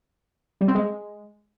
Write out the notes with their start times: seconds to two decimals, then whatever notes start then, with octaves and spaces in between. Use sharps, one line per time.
0.61 G3
0.68 C4
0.75 G#3